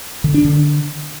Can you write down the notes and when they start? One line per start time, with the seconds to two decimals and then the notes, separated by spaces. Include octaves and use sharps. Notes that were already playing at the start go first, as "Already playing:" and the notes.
0.24 D3
0.34 D4
0.45 D3